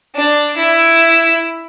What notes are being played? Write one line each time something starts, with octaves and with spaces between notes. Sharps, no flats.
D4
E4